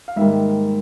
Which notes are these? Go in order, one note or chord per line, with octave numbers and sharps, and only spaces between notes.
F5
G#2 D#3 G3 A#3 E5